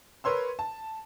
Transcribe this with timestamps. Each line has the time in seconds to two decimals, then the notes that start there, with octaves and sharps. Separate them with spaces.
0.24 A#4 B4 C#5 C6 E6
0.59 A5